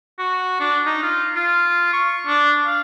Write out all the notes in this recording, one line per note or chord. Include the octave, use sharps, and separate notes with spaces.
F#4
D4
D#4
F4
F4
C#6
D4
F5